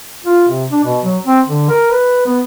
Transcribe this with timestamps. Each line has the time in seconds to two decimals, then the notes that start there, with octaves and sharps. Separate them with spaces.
0.25 F4
0.48 C3
0.71 D4
0.84 B2
1.04 F#3
1.26 C4
1.46 D3
1.69 A#4
1.91 B4
2.26 B3